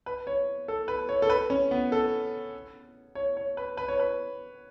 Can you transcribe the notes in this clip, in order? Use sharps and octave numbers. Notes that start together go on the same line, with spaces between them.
B4
C#5
A4
B4
C#5
A4
B4
C#4
B3
A4
C#5
C#5
B4
B4
C#5
B4